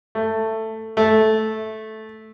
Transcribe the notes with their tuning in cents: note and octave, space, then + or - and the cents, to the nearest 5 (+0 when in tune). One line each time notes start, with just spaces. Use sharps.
A3 +10
A3 -10